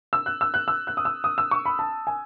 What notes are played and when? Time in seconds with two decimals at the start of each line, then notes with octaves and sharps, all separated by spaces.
0.13 E6
0.26 F#6
0.41 E6
0.54 F#6
0.68 E6
0.87 F#6
0.97 D#6
1.05 E6
1.24 D#6
1.38 E6
1.51 C#6
1.65 B5
1.79 A5
2.07 G#5